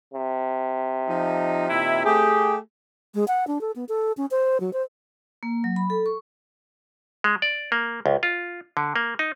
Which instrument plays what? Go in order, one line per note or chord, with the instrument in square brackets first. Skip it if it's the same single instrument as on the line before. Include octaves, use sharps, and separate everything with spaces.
[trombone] C3
[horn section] F3 D#4
A#2 D#3 E4
[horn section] A3 G4 [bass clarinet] G#4
[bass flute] G#3
F#5
D4
A4
B3
A4
C#4
C5
F#3
C5
[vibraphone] A#3
F#3
B5
A4
C#6
[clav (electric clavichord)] G#3
D5
A#3
C#2
F4
D3
A#3
D#4